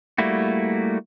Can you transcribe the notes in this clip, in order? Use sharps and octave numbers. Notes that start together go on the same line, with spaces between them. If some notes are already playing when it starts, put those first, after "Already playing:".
G3 A3 A#3 E4 F#4